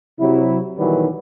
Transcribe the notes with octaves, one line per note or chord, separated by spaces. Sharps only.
C3 F#3 E4
B1 D#3 E3 F#3 G3 B4